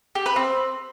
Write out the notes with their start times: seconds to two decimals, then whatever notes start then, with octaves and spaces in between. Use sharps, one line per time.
0.15 G4
0.26 B4
0.36 C4